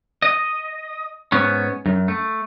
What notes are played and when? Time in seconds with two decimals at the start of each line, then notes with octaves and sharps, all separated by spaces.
0.22 D#5
1.32 G#2 B3 C#4
1.86 F#2
2.08 A3